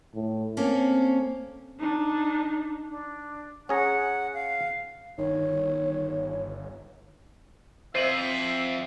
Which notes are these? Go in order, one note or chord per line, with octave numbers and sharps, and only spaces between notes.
A2
A#3 C4 C#4 A4
D4 D#4
D4
C#4 G#4 F#5 A#5
F5
G1 D#3 C#5
F2 C5 E5 C7 D#7 F#7